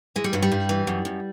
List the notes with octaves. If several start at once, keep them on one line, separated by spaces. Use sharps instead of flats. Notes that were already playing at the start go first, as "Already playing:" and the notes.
E3 G#3
G3
G2 F#3
G3
G2
E3
F#2
F#2